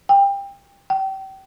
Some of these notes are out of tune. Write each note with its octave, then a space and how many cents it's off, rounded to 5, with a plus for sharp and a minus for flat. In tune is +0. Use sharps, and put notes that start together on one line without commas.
G5 +25
G5 -30